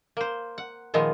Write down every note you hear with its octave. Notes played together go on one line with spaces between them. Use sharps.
A#3 C5
F#5
A#2 D#3 F3 G#3 B3